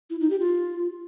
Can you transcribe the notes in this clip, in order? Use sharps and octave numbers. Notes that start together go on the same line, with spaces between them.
E4
D#4
G4
F4